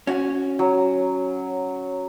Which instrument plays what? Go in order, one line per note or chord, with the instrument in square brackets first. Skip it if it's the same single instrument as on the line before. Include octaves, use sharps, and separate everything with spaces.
[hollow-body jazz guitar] C#4 F#4
[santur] F#3